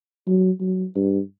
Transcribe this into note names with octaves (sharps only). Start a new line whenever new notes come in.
F#3
F#3
G2